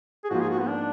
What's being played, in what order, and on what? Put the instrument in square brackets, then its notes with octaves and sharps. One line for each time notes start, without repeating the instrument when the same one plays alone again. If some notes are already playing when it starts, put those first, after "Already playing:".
[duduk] G#4
[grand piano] G#2 F3 A#3 F4 [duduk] F#4
[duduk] G#4
F#4
B3
D4